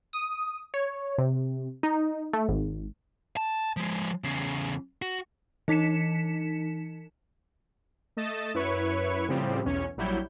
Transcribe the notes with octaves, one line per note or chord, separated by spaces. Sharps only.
D#6
C#5
C3
D#4
A3
G#1
A5
F3 G#3
E2 C#3
F#4
E3 D#4 B6 C#7 E7
A3 D#5 A6 E7
F#2 E4 B4 C#5 C#6
A2 C#3 F3 G3 C4 G4
B1 E2 C#4 C#5
A#1 F#3 G3 E4 C#5 G6